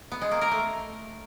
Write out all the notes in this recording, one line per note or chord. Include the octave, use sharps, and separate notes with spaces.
B3
G#3
A#3
A#4
A3